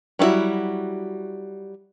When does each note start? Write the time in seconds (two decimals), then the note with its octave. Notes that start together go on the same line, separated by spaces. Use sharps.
0.19 F#3 G3 C4 E4 F#4